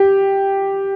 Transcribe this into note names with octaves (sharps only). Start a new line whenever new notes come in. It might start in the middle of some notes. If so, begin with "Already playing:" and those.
Already playing: G4